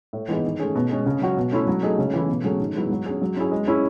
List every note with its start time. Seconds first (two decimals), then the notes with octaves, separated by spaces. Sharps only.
0.13 A2
0.28 E3 B3 D#4 G#4
0.44 D#3
0.60 A3 C#4 G#4
0.75 B2
0.90 G#3 C#4
1.06 C#3
1.22 F#3 C#4 F#4
1.37 B2
1.52 A3 C#4 E4
1.67 F#3
1.83 A3 D#4 G#4
1.98 C#3
2.14 E3 A3 E4
2.28 B2
2.44 F#3 A3 C#4 G#4
2.60 D#3
2.75 F#3 B3 E4 G#4
2.90 F#3
3.06 C#4 G#4
3.22 F#3
3.36 C#4 E4 G#4
3.51 G#3
3.67 C#4 E4 G#4